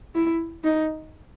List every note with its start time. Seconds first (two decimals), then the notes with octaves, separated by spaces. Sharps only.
0.15 E4
0.64 D#4